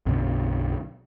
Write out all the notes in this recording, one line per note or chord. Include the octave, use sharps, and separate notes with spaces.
B1 F#2 B2 D3